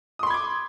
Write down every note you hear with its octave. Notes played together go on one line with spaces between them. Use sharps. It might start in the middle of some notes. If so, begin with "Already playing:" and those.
B5 C6 D6 D#6 G#6